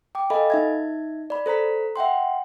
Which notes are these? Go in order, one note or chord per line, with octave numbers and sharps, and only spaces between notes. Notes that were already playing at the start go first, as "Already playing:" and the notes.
G5 D6
A4 D#5 F5 G#5 B5
D#4 E5 G#6
D5 B5
A4 C5 A#5 B6
E5 F#5 G5 C6